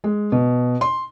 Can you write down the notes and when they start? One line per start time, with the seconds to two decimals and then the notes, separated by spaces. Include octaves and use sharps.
0.04 G#3
0.32 B2
0.81 C6